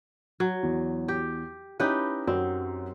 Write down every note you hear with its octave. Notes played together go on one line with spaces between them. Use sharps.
F#3
E2
G4
C#4 D#4 E4 G4 B4
F#2 F#3 C4